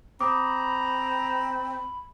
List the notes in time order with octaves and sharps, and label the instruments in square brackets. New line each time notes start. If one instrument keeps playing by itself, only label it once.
[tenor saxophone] C4 [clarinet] A#5 [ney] B5 [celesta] D6 D#6